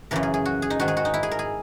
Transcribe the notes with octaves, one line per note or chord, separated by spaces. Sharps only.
F#2 C#3 E3 A#4
G#4
G#4
F#4
G#4
D#4
G#2 D#3 F#4
G#4
F#4
D#4
E4
G#4
A#4
G#4